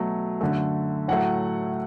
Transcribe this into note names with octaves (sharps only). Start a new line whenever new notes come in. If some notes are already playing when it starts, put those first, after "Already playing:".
Already playing: B2 F#3 A3
F#2 D3 A3
A2 F#3 A3 F#5